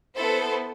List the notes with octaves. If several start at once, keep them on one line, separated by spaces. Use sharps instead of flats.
B3 E4 A4 C5